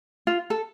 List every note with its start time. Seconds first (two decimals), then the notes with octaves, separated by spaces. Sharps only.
0.27 F4
0.50 A4